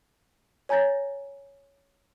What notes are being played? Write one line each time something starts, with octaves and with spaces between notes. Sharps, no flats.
C#5 G#5 A#5 G6 A6 A#6